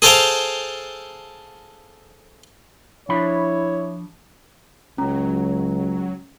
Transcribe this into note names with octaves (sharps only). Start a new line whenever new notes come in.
G#4 A4 C5 F5 G5 A#5
F3 D4 E4 C#5 B5
C#2 F#3 C#4 A#5